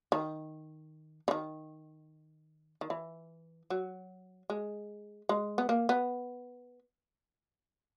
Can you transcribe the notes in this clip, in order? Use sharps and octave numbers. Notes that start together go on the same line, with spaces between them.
D#3
C#3
D#3
D#3
E3
F#3
G#3
G#3
B3
A#3
B3